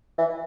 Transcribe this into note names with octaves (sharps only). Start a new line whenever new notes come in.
E3